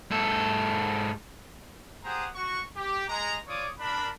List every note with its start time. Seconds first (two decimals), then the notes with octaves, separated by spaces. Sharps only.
0.11 G#2 A4
2.04 G4 G#4 C5 F#5 A#5 D#6
2.35 F#4 C#6
2.76 G4
3.09 G#3 A#5
3.47 F4 C#5 D5 D6 D#6
3.79 D4 A#4 B5